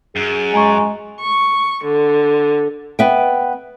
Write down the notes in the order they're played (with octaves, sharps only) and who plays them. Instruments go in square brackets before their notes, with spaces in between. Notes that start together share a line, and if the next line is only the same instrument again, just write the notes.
[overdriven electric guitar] F#2 [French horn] G#4
[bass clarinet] G#3 [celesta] G#5 A#5 C#6
[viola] C#6
D3
[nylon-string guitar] B3 E5 G5